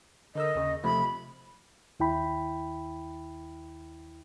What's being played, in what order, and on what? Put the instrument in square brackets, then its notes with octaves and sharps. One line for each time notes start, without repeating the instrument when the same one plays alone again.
[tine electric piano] D3 A#4 E6 [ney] D#5
[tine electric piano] D#2 C#3
[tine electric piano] C3 F3 A3 [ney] B5
[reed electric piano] D#2 E4 G5 B5